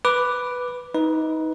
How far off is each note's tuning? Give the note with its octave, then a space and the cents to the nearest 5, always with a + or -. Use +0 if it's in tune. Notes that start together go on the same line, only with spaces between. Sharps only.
B4 +0 D6 +0
D#4 +25 B4 +0